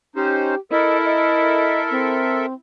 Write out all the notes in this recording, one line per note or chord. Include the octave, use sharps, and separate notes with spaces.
C#4 D#4 G4 C5
E4 A4 A#4 D#5 E5
D#5
C4